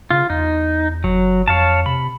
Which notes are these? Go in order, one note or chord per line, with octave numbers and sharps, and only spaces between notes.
C#3 F4
E2 D#4
F#1 F#3
F2 C#5 F5 A5
C3 B5